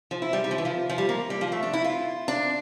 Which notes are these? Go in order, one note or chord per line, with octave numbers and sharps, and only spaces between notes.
F3
E4
G3
G3
F3
E3
F3
F3
G3
A#3
G3
F3
A3
D4
E4
F4
D4